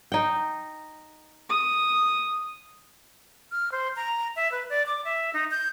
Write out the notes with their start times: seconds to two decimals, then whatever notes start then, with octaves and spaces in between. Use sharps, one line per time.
0.12 D#4 G5
1.49 D#6
3.52 F6
3.72 C5
3.96 A#5
4.36 E5
4.52 B4
4.70 D5
4.86 D6
5.05 E5
5.34 D#4
5.51 G6